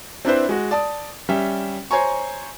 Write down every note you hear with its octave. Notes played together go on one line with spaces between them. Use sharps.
C4 D4 E4 B4 C5
G#3 F#4
D5 A5 D6 D#6
G3 C#4 E5 G5
C5 C#5 G#5 A#5 C#6